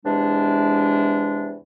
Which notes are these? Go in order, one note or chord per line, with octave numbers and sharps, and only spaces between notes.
E2 C3 E3 G#3 D4